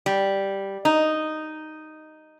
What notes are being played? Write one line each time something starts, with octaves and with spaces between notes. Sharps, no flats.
G3
D#4